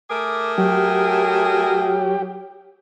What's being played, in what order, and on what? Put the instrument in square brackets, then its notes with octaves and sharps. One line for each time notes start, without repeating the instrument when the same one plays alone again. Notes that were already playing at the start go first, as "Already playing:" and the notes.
[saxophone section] A3 G#4 A#4 [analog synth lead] D6
[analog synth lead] F#3 [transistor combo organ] G4